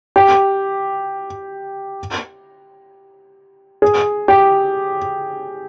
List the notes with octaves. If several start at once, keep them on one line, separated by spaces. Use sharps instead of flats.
G4
G#4
G4